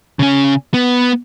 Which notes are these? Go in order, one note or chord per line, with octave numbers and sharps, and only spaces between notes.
C#3 C#4
B3